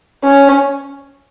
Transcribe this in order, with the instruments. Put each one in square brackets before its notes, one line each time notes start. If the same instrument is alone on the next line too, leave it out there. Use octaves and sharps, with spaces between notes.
[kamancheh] C#4